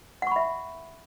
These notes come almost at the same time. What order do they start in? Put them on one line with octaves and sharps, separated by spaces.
F#5 C#6 B5 E5